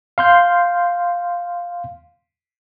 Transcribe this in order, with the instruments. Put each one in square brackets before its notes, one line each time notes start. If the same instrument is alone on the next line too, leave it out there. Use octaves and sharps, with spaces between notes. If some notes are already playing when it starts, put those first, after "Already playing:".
[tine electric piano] F5 C6 G6